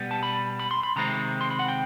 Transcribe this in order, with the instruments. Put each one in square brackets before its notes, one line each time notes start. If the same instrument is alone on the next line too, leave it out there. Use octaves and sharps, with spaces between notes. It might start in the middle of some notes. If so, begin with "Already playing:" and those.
Already playing: [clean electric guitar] B2 G3 B3
A5
B5
B5
C6
B5
C3 D#3 G#3 C4 A#5
C6
B5
F#5
G5